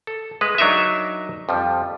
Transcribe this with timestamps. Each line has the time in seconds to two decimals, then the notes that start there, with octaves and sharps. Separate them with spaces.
0.07 A4
0.41 G#3 B4
0.58 F#3 D4 D#4 A#4 D#5 E5
1.49 F2 F3 G3